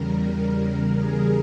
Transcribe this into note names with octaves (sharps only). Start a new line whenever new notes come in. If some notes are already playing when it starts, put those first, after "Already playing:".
Already playing: E2 C#3 G3 A#4
G#4